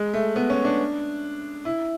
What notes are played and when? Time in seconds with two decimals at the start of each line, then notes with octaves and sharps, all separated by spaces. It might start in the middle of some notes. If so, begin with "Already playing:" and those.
Already playing: G#3
0.14 A3
0.36 B3
0.50 C#4
0.65 D4
1.65 E4